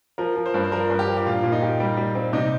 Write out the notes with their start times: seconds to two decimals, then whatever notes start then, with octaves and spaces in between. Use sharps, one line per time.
0.18 F3 A#4
0.36 F3
0.46 C5
0.54 G2
0.64 C5
0.72 F3 A#4
0.90 G2
0.99 G4
1.07 F3
1.17 G4
1.26 A#2 F4
1.43 A#2
1.52 D#4
1.62 G4
1.80 G3
1.97 G3
2.15 C4
2.33 C3 D#4